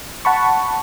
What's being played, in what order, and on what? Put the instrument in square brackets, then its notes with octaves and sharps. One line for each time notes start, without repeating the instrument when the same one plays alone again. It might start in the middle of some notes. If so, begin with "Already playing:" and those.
[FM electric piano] F#5 A5 B5 C#6